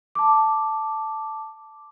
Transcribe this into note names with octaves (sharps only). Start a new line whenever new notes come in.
A5 D6